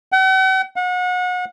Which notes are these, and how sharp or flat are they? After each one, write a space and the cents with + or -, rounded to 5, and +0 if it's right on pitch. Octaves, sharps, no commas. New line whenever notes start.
F#5 +45
F#5 -35